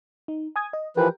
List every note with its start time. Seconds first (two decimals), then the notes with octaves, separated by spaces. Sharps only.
0.28 D#4
0.56 G#5 D#6 G#6
0.73 D#5
0.97 E3 F3 G4 A#4 B4 G5